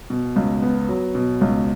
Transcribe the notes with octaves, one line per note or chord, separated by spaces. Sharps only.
B2
C#2
B3
F#3
B2
C#2